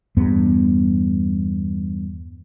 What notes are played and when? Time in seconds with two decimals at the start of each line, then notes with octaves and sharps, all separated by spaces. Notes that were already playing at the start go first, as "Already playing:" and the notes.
0.17 E2 G2 B3